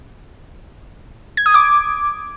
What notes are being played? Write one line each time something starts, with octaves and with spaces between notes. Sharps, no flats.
G#6
D#6
D6